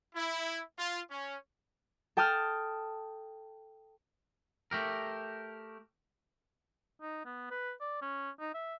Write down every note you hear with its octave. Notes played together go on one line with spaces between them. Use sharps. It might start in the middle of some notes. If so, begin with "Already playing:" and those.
E4
F4
C#4
A4 G5 A5 D#6 F6
A3 G4 A#4
D#4
B3
B4
D5
C#4
D#4
E5